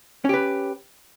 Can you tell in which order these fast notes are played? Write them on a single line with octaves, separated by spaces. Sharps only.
C#4 G4 B4